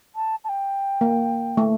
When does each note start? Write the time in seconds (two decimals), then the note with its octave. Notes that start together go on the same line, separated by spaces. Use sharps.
0.16 A5
0.44 A5
0.49 G5
1.01 A#3
1.57 A3